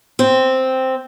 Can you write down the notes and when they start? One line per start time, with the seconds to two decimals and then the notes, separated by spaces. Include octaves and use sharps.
0.19 C4